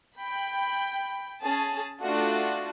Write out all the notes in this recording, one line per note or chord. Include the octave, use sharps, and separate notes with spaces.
G5 B5
C#4 G#4 A5
A3 D4 F4 F#4